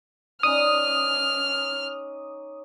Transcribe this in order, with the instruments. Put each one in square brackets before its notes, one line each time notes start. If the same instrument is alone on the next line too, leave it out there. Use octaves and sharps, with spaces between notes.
[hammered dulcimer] C#4 D#4 D5 [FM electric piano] D#6 [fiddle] F6